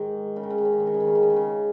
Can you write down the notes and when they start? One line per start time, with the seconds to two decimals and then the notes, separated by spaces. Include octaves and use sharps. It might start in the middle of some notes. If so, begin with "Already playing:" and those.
Already playing: G#2 D#3
0.36 C#3
0.43 D#3
0.50 C#3
0.58 D#3
0.65 C#3
0.72 D#3
0.80 C#3
0.87 D#3
0.94 C#3
1.00 D#3
1.07 C#3
1.15 D#3
1.23 C#3
1.30 D#3
1.36 C#3